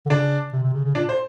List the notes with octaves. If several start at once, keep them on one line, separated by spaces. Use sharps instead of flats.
D3
C#3 D4 D5
C3
C3
C#3
C#3
A#2 D4 D5
C5